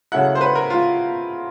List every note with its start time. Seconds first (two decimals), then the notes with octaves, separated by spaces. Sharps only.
0.12 C#3 F#3 A3 C#4 E4 F#5
0.35 C5
0.41 B4
0.55 A#4
0.70 F4